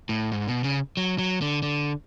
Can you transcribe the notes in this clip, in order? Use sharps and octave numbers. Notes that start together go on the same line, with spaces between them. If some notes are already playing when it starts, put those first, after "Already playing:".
A2
G#2
B2
C#3
F#3
F#3
D3
D3